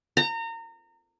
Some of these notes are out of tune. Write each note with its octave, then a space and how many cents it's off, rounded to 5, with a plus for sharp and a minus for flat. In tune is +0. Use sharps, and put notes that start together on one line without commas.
A#5 -30